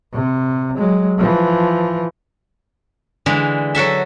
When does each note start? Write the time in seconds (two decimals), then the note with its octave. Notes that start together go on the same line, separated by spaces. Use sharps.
0.13 C3
0.76 F#3 G#3
1.17 E3 F3
3.26 D3 E3 G#3
3.75 F#3 F#4 A4 E5